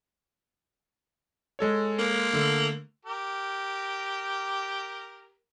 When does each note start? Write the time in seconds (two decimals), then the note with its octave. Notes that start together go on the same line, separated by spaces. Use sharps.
1.59 G#3 A4 C#5
1.99 A#3
2.33 D3 A3
3.05 G4 A#4